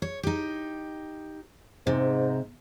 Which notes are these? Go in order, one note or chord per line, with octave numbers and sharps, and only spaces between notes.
C#5
D#4 G4
G#2 C3